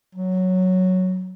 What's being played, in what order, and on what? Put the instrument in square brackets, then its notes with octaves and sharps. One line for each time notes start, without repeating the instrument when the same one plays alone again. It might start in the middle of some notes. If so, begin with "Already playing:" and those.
[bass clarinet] F#3